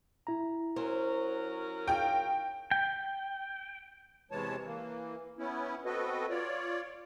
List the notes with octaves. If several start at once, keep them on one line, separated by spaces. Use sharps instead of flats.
E4 A#5
F#3 C#4 A#4 C5
D#4 F4 G#4 G5
G5
E2 C3 E3 G#3 C#5 A5
E3 A#3
B3 C#4 E4
B3 C4 F#4 A4 B4 D#5
F4 C#5 D5